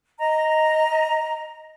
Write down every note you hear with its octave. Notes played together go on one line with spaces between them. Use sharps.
D#5 A#5